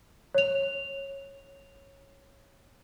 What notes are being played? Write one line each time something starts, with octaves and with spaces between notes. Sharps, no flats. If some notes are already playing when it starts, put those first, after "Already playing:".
C#5 F7